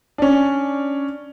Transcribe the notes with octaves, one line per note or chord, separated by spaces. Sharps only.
C#4 D4